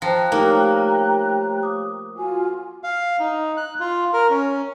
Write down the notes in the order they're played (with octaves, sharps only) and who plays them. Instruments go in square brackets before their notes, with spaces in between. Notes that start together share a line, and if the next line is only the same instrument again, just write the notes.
[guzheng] F3 [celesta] C5 A5 A#6 [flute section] G5 A#5 F#6
[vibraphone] A3 G4 C#5 [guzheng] A#3 [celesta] D#4 A#4
[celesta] D6 D#6
[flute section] F4 F#4 G#5
[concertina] F5
D#4
F#6
F4
A#4
C#4